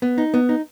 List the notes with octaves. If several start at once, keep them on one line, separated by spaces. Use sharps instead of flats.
B3
D#4
B3
D#4